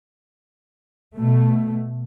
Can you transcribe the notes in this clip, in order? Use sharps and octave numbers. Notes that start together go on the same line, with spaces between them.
B2 A3